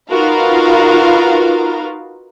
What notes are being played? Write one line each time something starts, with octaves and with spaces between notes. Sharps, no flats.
D#4 F4 F#4 A#4 B4 F5